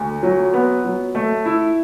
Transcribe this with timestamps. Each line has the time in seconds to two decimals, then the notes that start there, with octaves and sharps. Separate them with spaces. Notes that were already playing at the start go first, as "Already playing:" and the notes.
Already playing: D2
0.23 F#3
0.54 B3
0.85 F#3
1.15 A3
1.46 E4